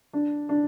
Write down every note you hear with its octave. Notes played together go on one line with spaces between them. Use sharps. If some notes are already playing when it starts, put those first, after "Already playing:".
D4
D4